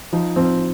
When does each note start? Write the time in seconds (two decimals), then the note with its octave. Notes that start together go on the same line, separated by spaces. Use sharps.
0.13 F3 D#4
0.36 F3 C4